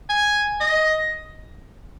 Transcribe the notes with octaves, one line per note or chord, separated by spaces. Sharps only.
G#5
D#5